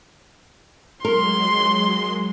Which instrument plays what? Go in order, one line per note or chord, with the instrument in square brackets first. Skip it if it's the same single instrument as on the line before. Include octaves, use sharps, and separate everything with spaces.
[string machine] F#3 G#3 [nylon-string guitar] A#4 [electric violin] C6